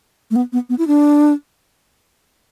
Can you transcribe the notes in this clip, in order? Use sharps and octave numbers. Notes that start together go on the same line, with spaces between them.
A3
B3
B3
B3
E4
D4